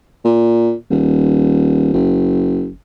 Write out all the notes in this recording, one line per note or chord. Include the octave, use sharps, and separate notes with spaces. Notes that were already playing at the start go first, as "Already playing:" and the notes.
A#2
D#1
F#1